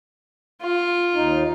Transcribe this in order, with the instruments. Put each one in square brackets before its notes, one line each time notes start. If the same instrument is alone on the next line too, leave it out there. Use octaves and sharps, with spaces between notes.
[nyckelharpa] F4
[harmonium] D#2 D#4